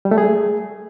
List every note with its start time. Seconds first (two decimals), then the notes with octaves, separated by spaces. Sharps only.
0.05 G3
0.11 A3
0.18 G#4